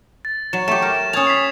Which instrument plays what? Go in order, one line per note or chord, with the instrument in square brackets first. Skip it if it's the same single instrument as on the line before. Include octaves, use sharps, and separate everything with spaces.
[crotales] A6
[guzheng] F#3 [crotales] E7
[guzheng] A3 G4 [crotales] E7
[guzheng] A#4
[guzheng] C#4 A5 [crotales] D#6 G#6 F7
[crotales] B6 C7